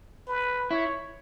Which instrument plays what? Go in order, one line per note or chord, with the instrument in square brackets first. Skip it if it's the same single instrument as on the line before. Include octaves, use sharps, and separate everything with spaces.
[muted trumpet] B4
[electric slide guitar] E4 [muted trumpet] C#5